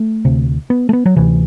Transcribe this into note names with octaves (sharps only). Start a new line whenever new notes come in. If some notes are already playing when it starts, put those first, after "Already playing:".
Already playing: A3
D2 C3
B3
A3
B3
F#3
D2 C3 E3